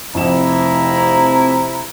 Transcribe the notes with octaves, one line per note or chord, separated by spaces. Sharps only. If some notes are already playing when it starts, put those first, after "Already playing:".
F1 F2 C3 E4 A#5 E7